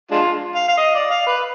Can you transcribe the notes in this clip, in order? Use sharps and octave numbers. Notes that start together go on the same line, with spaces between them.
G#3 D4 F4
F5
F5
D#5
D5
F5
B4